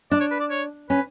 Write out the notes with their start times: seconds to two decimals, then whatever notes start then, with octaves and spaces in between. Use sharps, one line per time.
0.11 D4 D5
0.20 C#5
0.31 B4
0.40 D5
0.50 C#5
0.90 C#4 B4